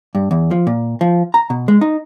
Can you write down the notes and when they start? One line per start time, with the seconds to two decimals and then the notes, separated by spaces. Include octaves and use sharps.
0.15 G2
0.31 E2
0.51 F3
0.67 A#2
1.01 F3
1.34 A#5
1.50 B2
1.68 G#3
1.81 D#4